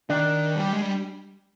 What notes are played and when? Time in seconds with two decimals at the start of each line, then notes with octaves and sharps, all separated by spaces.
0.09 D#3 D4 D5
0.55 G3
0.72 G#3
0.82 G3